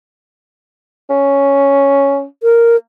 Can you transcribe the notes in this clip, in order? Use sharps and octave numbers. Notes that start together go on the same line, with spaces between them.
C#4
A#4